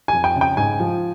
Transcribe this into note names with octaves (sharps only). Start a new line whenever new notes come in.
F2 G#5
G5
C#3
G5
G#2 G#5
F3